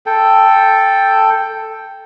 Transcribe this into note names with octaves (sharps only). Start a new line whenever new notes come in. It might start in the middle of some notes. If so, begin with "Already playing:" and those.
A4 G5